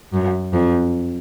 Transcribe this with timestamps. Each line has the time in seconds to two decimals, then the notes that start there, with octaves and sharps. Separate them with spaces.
0.13 F#2
0.53 F2